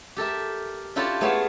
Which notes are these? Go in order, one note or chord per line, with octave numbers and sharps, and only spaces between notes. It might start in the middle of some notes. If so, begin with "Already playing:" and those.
G4 A4 A#4 E5
D4 E4 F4 G4 A4 C#5
A3 B3 G#4 C#5 E5 F5